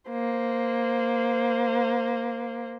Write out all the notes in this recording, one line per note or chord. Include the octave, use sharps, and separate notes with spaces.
A#3 C5